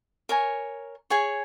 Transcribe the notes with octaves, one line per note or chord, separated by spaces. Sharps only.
A#4 C#5 G#5
G#4 C#5 G#5